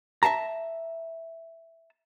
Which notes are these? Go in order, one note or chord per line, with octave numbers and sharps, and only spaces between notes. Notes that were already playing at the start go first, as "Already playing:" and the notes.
E5 F5 A5 A#5